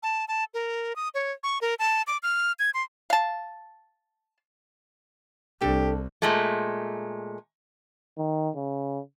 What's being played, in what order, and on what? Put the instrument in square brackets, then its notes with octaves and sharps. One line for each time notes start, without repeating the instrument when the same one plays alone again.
[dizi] A5
A5
A#4
D#6
C#5
C#6
A#4
A5
D6
F6
G#6
C6
[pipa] F5 A5
[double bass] C2 [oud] D4 A4 [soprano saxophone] G4
[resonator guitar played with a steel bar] A#2 G#3 A3
[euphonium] D#3
C#3